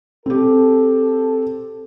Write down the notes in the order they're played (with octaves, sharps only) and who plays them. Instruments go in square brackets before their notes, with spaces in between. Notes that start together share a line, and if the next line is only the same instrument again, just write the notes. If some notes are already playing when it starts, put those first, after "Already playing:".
[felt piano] C4 G4 [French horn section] A4